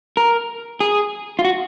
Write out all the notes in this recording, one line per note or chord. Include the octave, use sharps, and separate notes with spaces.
A#4
G#4
F4
F#4